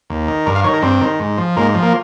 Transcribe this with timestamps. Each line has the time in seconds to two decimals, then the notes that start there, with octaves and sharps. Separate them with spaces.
0.10 D#2
0.28 D#3
0.46 G2 A#4
0.55 F5
0.64 D#3 C#5
0.74 A#4
0.82 G2 C4
1.01 D#3
1.20 G#2
1.38 F3
1.56 G#2 A#3
1.74 F3
1.82 A#3